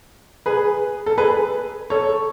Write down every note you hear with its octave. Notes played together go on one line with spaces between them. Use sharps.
G#4 B4
A4
G#4 B4
A4 C#5